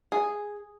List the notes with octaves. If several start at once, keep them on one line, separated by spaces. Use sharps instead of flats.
G#4